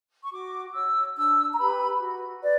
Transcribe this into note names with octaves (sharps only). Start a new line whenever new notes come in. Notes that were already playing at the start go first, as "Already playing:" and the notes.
C#6
F#4 D6
C#5 E6
D4 E6
A#5
G4 B4 B5
F#4
B4 D5